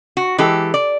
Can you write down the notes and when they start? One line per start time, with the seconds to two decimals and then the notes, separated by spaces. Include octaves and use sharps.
0.17 F#4
0.38 E3 G#3 G4 A4
0.74 D5